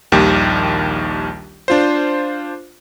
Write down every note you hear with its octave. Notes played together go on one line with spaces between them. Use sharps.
A#1 D#2 D#3 G3 G4
D4 F4 C5